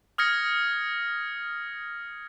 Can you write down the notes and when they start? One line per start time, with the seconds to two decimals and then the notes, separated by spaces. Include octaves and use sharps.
0.18 D#6 F6 G#6 A#6 C#7